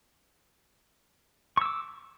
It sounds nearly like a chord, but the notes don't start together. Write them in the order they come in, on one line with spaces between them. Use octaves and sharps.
C#6 E6 D6